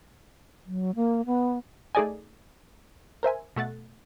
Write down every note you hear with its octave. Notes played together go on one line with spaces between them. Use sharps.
F#3
A#3
B3
A3 D#4 G#4 D5 D#5 G#5
A#4 C5 E5 G#5
B2 A3 F#5 A6